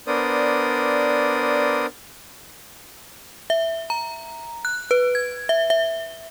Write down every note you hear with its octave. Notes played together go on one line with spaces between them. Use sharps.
B3 D4 A#4 C5 D5 D#6
E5
A#5
F#6
B4
G#6
E5
E5